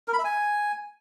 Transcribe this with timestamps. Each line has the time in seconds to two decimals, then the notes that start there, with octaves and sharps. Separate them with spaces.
0.08 A#4
0.13 B5
0.19 E5
0.24 G#5